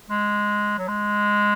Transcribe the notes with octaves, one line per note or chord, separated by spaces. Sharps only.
G#3
F#3
G#3